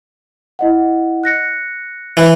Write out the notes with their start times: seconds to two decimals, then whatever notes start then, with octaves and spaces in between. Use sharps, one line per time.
0.59 E4 D#5 F#5
1.23 F#6 A#6 C#7
2.17 E3